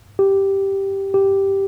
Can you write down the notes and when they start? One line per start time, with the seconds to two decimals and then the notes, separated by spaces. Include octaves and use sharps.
0.19 G4
1.14 G4